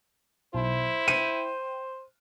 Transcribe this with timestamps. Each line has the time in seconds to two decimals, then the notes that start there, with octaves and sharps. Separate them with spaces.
0.54 B1 E4 C5
1.08 G5 D#7